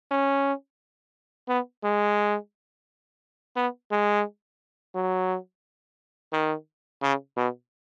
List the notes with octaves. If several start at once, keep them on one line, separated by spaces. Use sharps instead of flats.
C#4
B3
G#3
B3
G#3
F#3
D#3
C#3
B2